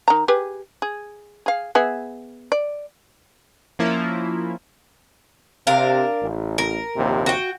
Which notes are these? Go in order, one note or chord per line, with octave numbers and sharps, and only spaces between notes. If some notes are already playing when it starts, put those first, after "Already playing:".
D#3 A#5
G4 G#4 B4
G#4
G#4 F5
B3 G#4 E5
D5
F3 A#3 C#4 E4 F4
C3 D4 A#4 F5
A1
A#4
A#1 D#2 C3
F#4 G5